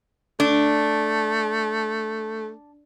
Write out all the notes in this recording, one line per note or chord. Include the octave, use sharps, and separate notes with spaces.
A3 D4